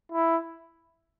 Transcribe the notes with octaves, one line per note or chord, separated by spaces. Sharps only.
E4